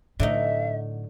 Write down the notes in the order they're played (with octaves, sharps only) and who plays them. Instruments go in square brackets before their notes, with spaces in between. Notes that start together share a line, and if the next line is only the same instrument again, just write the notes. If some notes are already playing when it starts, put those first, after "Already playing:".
[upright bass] A2 [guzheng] D3 F#3 D#4 [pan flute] E5